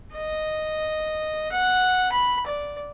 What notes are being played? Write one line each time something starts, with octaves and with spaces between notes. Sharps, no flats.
D#5
F#5
B5
D5